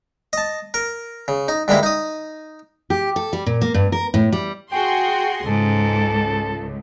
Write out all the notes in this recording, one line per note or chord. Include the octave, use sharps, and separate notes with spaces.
D#5 A5
A#4
C#3
D#4
G2 D3 G#3 A#3 E4
D#4 D#6
G4
A4
G3
A#2
A#3
G2
A#4
A2
G3
F#4 G#4 G5 C6
C#2 G#2 A4